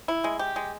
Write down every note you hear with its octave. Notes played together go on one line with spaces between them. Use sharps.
E4
G#3
G4
G#3